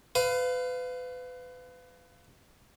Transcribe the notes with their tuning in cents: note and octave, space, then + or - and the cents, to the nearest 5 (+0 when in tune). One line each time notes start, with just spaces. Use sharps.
B4 +30 F5 +0